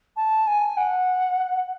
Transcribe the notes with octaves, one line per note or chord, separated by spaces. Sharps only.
A5
G#5
F#5